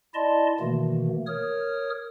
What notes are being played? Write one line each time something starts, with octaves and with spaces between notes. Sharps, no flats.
E4 D5 D#5 A5 C6
B2 D#3 E3 A3 A#3
A#4 C#5 D#6 F6